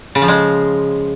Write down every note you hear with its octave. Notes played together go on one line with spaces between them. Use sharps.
C#3
F3
G#3